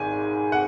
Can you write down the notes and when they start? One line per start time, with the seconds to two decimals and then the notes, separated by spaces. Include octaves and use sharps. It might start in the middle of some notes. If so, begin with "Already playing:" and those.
Already playing: G#1 G#2 G#5
0.52 F#5